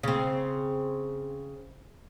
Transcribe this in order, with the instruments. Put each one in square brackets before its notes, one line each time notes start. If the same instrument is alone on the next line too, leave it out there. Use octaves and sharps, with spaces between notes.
[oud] C#3 C4